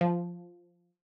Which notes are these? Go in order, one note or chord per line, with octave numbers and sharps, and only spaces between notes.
F3